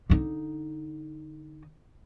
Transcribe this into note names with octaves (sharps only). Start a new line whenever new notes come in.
D3 D#4